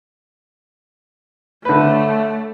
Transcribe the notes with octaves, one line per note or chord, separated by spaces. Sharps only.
D3 A3 A4 B4 C#5 E5